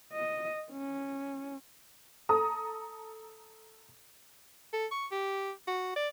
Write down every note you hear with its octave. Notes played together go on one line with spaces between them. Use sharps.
D#5
C#4
A4 A#5 D#6
A4
C#6
G4
F#4
D5